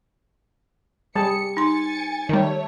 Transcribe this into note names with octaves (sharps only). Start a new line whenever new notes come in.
G3 G#4 A5 C#7
D#4 G#5 C6 A6 C#7
D#3 G3 A3 C#5